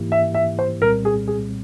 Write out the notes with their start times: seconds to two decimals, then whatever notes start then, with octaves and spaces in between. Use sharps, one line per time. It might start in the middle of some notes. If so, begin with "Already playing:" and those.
Already playing: G#2 E3 A#3 E4 G4
0.12 E5
0.34 E5
0.59 C5
0.82 C2 A#2 G3 C4 A#4
1.05 G#4
1.28 G#4